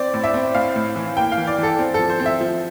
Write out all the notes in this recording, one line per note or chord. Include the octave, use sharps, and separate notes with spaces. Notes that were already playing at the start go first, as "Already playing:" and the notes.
Already playing: C4 D5
A2
E5
C4
A2 F5
A2
E3
A#3 G5
F5
E3
D5
E3 A4
C4
F3 A4
C5
C4
E5
F3